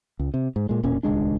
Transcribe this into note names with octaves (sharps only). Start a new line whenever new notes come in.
C#2
C3
G#2
A#2 G#3
E1 A#2 C#4
D#1 C#2 G#3 D4